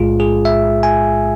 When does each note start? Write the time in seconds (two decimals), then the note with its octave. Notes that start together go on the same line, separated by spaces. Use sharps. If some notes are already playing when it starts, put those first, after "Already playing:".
Already playing: B1 A2 G#3 F4 G#4
0.20 G#4
0.45 E5
0.83 G#5